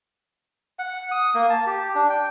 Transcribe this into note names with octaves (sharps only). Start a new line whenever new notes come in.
F#5
D#6
A#3
A5
G4
D4
G5